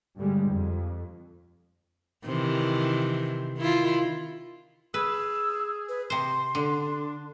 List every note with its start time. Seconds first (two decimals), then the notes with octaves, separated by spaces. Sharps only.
0.17 G2 B2 D3 G3 G#3
0.47 F2
2.25 C3 D#3 E3
3.58 D#3 E4 F4
4.94 G#4 B4 E6
5.89 B4
6.10 C3 C5 C6
6.55 D3 D4